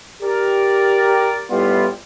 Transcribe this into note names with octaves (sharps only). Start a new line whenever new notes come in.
G4 A#4 D5
A2 G3 B3 E4 F4